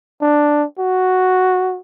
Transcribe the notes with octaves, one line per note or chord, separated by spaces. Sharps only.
D4
F#4